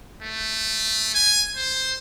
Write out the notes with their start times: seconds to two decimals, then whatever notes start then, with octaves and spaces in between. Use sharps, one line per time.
0.23 A3
1.15 G#5
1.57 C5